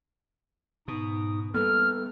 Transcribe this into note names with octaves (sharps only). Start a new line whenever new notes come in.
G#2 B2 D#4 D#6
G3 A#3 B3 A4 B4 F6